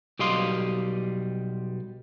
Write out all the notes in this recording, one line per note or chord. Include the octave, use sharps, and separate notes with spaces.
B1 G3 G4 D#5 F5 C6